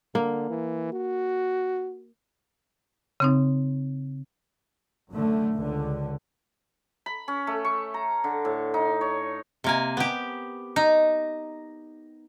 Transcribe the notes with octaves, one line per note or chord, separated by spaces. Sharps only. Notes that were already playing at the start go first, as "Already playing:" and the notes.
D3 A#3
E3
F#4
C#3 C4 D#4
F#2 D3 A3
C#2 D3
B5
C#4
A3
C#6
A#5
D3
A2
D#4
C#5
C3 A#3 G#5
B3 G4
D#4